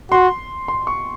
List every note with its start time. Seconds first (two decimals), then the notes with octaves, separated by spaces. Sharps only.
0.11 F#4 C6
0.68 C6
0.87 C#6